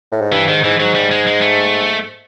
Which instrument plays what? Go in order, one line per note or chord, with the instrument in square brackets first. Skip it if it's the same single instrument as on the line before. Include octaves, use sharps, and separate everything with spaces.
[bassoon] A2
G#2
[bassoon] G2 [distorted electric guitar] E3
[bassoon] G#2 [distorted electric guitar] D#3
[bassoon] G#2 [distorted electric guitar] E3
[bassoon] G#2 [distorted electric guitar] F#3
[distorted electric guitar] G3
G#3
G#3
A3